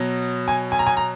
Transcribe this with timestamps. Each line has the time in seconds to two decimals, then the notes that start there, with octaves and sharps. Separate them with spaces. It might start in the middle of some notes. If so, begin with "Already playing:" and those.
Already playing: B2 F#3
0.48 G#5
0.72 G#5
0.79 A#5
0.87 G#5
0.97 A#5